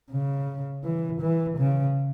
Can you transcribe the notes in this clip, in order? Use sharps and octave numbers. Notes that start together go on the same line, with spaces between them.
C#3
E3
E3
C#3